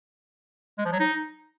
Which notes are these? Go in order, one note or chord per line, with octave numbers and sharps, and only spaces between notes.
G#3
F3
F#3
D#4